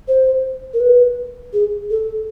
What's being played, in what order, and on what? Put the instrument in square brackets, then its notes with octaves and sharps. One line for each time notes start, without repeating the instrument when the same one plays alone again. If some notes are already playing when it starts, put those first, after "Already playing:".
[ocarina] C5
A#4
B4
G#4
A4